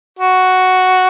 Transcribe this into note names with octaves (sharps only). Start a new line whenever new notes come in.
F#4